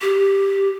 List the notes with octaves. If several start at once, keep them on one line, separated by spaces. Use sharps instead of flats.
G4